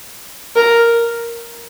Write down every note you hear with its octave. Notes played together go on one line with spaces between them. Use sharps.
A#4